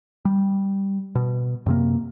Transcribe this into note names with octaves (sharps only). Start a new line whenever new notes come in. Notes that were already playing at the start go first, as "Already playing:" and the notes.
G3
B2
F#2 C3 A#3